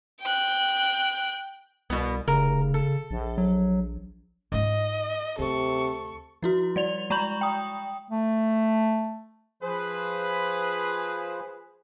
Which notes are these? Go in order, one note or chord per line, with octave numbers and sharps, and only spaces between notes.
G5 F#6
C2 B2 B3
F1 C#3 A#4
A4
A#1
F#3
G#2 F4 D#5
D2 C3 A4 C#6
F3 E4 F#4
G3 D5 F7
G#3 A#5 B5 C#6 G6 F#7
G5 D#6
A3
F3 G#4 B4 C5